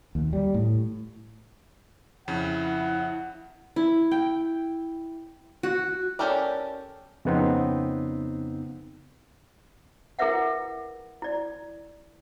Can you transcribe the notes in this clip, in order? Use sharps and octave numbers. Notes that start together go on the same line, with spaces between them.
D#2
G3
A2
F2 C#3 E4 F#5
E4
G5
F#4
C#4 G4 A4 A#4 D5
F2 C#3 B3 C4 D#4
E4 G#4 A#4 B4 E5 F#5
E4 D5